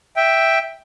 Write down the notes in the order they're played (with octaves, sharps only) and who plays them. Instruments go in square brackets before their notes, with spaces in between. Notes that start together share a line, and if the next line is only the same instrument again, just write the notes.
[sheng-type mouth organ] E5 G5